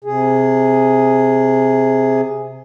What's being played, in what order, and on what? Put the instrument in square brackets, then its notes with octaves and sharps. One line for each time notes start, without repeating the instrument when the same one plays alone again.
[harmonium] C3 G#4